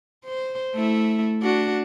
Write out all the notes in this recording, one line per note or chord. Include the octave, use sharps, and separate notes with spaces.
C5
A3 E4
D4 F#4